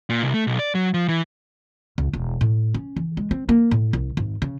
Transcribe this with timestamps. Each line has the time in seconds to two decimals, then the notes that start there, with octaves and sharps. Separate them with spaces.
0.10 A#2
0.22 C2
0.34 A3
0.47 B1
0.59 D5
0.75 F#3
0.94 F3
1.08 E3
1.98 C#2
2.13 E1
2.41 A2
2.74 C#4
2.96 E3
3.17 G#3
3.31 C4
3.49 A#3
3.71 A2
3.93 C2
4.17 G#1
4.42 C#3